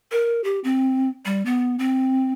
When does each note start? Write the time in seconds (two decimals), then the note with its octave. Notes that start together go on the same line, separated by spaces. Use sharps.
0.12 A#4
0.44 G4
0.64 C4
1.25 G3
1.46 B3
1.79 C4